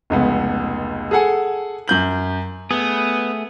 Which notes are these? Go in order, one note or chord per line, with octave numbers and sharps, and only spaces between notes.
F1 C#2 B3
G#4 A4 F#5 G#5
F#2 G6 F#7
A3 B3 G#4